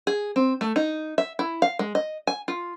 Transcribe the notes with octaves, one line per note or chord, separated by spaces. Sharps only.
G#4
C4
A3
D#4
E5
E4
F5
G#3
D#5
G#5
F4